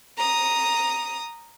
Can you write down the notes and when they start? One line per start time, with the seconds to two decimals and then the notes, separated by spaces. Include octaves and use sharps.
0.18 A#5 D#6